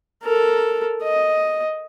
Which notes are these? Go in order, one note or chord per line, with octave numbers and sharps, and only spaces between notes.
A4 A#4
D#5